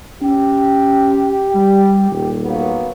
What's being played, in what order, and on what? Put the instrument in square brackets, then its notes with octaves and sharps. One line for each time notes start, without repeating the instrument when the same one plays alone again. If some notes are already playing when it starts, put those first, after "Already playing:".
[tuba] C#4 [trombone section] G4
[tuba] G3
D#1
[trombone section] F#3 A#3 B3